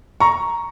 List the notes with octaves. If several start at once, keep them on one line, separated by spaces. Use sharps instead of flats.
A#5 C#6